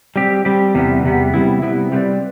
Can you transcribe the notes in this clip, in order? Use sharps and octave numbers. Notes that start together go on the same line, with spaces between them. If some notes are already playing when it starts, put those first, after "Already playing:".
G3 C4 G4
G3 C4 G4
E2 C3 G3 B3
E2 C3 G3 B3
C3 G3 B3 E4
C3 G3 B3 E4
G3 C4 G4 B4 D5